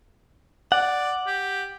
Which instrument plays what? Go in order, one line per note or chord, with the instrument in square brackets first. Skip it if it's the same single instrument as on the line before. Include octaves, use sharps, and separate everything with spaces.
[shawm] D5 [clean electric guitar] F#5
[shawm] G4